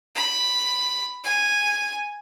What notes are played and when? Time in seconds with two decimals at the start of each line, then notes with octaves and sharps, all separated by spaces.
0.16 B5
1.24 G#5